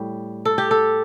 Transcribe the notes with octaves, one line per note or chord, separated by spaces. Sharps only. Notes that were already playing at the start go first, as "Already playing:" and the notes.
Already playing: A2 G3
A4
G4
A4